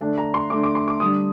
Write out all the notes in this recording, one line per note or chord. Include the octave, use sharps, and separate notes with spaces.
D3 A3 D4 A5
A#5
C6
D3 A3 D4 D6
D6
C6
D6
D3 G3 D4 D#6